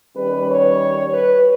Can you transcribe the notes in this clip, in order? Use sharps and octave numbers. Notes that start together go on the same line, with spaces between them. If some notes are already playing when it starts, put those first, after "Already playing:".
D#3 G3 C#4 B4
C#5
B4